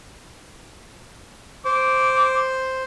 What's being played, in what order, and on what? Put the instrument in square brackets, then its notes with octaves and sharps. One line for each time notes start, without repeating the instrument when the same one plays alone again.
[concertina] C5 [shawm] D6